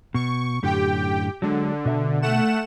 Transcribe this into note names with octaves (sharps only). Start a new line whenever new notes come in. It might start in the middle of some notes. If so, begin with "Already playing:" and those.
B2 C#6
F#2 A2 D3 G4 G5
D3 F#3 G#3
B2 E5 A5
A3 F#5 E7